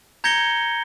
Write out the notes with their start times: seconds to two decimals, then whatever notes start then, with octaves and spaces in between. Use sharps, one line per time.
0.24 A#5 G6 G#6 A#6 C#7 G7